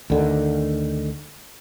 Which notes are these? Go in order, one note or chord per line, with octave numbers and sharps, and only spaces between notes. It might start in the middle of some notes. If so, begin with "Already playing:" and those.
D2 D3 D#3